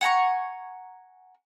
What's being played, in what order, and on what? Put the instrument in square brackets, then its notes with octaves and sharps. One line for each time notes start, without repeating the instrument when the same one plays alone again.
[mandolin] F#5 G#5 A#5 C#6